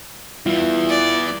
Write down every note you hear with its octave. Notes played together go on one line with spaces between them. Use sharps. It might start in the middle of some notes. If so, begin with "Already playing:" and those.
E2 E3 G3 B3 E4 F4
D5